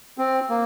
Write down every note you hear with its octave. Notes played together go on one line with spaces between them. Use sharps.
C4
A#3